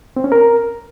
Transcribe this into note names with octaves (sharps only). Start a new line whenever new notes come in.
C4
C#4
A#4